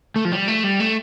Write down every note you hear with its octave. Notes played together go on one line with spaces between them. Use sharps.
A3
F3
G3
A3
G3
A3